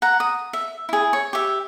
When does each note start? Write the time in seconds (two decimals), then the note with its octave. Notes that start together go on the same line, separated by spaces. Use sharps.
0.02 F#5 A#5
0.20 D#6
0.53 E5
0.89 E4 G#4
1.13 C#5
1.33 G4 E5